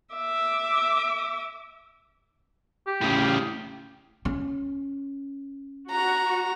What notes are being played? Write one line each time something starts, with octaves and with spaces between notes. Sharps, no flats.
E5 D6
G4
A2 C#3
C#4
F#4 A#5